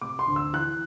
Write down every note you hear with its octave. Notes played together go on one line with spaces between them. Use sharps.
C3 D6
C6
D2
E6
E3 F#6